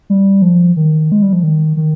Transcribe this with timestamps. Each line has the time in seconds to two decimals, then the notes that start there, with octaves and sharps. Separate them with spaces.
0.10 G3
0.42 F3
0.77 D#3
1.12 G#3
1.22 G3
1.33 F3
1.43 D#3
1.77 D#3